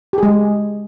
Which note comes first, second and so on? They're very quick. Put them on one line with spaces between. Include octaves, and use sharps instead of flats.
G4 G#4 G#3